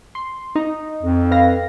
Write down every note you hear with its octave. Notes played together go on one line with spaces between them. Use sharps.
C6
D#4
F2
B4 F5 A#6